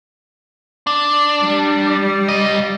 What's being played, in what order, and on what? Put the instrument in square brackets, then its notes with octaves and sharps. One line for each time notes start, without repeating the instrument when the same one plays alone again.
[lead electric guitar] D4
[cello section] G3
[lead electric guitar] C#2 D#5